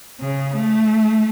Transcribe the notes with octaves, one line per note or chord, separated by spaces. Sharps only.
C#3
A3